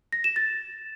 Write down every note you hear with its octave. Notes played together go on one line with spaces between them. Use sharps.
A#6
E7
A6